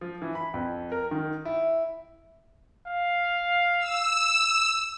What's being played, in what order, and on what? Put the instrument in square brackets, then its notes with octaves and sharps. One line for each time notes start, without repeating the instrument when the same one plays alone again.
[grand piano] F3
E3
B5
F2
A#4
D#3
E4
[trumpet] F5
[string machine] E6